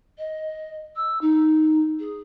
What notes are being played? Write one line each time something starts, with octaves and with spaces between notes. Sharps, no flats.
D#5
E6
D#4
G#4